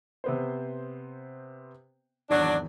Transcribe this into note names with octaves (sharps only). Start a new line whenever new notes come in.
C3 B3 C5
G#1 E2 F#3 D4